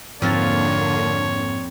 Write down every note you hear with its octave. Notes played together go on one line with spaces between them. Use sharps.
F2 G#2 D3 A#3 C4 F4 C#5 A6